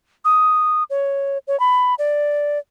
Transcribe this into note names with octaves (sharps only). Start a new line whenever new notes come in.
D#6
C#5
C#5
B5
D5